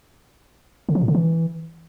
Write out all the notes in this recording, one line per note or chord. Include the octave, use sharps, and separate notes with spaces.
D3
F3
A#2
D3
E3